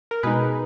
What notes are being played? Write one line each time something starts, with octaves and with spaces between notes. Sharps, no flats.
A#4
B2 G#3 D#4 G#4 B4